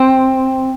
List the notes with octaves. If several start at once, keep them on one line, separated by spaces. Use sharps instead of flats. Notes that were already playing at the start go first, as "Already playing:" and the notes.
Already playing: C4